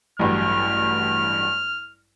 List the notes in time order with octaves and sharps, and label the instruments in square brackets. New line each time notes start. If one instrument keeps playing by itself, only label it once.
[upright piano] A1 G2 F#3 [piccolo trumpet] F6